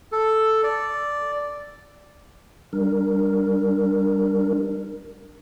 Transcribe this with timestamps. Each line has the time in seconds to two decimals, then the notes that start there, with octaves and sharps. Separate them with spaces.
0.12 A4
0.63 D5
2.73 G3 D4 A#4